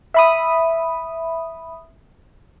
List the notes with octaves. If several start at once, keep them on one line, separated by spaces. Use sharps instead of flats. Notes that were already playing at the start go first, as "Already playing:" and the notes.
E5 B5 D#6